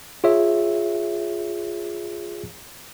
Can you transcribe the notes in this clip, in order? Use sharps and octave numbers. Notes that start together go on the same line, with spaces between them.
F4 G#4 C#5 E5